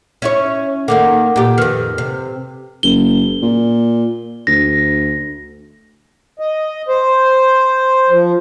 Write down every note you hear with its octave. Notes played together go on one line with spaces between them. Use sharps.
C#4 E4 C#5
D#3 A#3 D#4 A4 F#5 D6
A#2 G4
F2 D#3 A4 B4 F6
C3
F#1 G7
A#2
D2 A#6
D#5
C5
F3